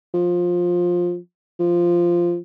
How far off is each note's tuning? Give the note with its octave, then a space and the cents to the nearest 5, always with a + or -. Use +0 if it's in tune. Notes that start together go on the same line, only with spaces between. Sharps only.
F3 +15
F3 -10